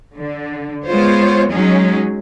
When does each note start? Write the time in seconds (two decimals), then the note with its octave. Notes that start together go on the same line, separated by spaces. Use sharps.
0.17 D3
0.86 G#3 B3 F4 C5 C#5
1.51 F#3 G#3 C#4 D#4 G#4